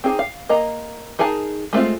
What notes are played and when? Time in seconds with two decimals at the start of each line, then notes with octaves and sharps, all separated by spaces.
0.04 C4 D#4 G#4
0.19 F5
0.49 A#3 D#5 A#5
1.19 D#4 G#4 A#4 G#5 A5
1.73 G#3 A3 C4 F4